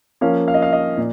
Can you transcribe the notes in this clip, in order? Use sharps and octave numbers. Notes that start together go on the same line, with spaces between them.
F3 A#3 C#4 F5
F5
D#5
F5
D#5
A#2